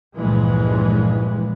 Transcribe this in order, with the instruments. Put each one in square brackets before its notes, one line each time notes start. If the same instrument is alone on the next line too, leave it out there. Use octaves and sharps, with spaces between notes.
[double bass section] C#2 G2 A#2 E3 F3 G#3